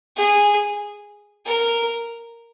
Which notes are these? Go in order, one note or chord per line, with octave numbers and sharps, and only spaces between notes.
G#4
A#4